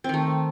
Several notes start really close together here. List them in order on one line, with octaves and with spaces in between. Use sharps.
C4 D#3 A3